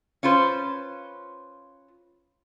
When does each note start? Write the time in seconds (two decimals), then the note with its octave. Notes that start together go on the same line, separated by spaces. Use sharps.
0.23 C#4 F4 B4 C5